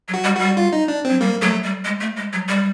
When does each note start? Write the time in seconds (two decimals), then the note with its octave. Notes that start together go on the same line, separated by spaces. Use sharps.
0.08 F#3
0.14 F#4
0.24 G3
0.35 G3 F#4
0.57 F4
0.72 D#4
0.88 D4
1.05 F#3 C4
1.20 G3 A#3
1.42 F#3 A3
1.64 G3
1.85 G#3
2.00 A3
2.17 G#3
2.33 F#3
2.49 G3